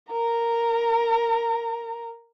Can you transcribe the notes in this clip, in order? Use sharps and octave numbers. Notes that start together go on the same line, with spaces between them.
A#4 A#5